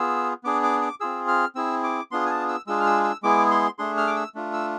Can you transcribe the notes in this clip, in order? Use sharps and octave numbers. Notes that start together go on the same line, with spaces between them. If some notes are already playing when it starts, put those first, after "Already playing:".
Already playing: B3 F4 G#4 E6
B3 D4 G#4 D6
D6
D6
C4 F4 G#4 E6
F6
C4 E4 G#4 E6
D6
B3 D4 F4 G#4 C6
G#5
A5
E6
G#3 D4 F4 G#4 E6
F6
E6
E6
G#3 B3 E4 G#4 D6
C6
A3 D4 G#4 C6
F6
D6
E6
A3 D4 F4
E6